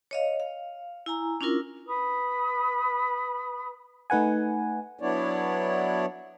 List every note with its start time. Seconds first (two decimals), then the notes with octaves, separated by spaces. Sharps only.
0.11 C#5 D#5 F5
0.40 F5
1.06 E4 G#5 A#5
1.41 C#4 D4 E4 F4 A#4
1.86 B4 B5 D#6
4.10 A3 D#4 B4 F#5 G#5
5.00 F#3 B3 D4 E4 C#5 D5